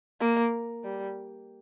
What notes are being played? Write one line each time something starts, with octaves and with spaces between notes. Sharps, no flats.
A#3
G3